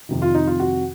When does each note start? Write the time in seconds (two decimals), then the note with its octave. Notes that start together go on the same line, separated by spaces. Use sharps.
0.09 F2 C3 D#3
0.22 F4
0.35 D#4
0.47 F4
0.60 F#4